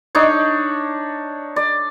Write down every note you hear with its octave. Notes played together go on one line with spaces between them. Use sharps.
D4 D#4 C#5
D5